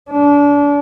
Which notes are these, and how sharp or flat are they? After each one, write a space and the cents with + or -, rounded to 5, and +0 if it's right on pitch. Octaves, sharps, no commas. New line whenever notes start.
D4 -30